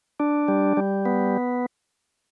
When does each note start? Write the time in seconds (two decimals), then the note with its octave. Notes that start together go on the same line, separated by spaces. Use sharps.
0.20 D4
0.48 G3
0.77 G3
1.06 B3